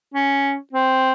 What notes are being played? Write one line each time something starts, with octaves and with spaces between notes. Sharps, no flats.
C#4
C4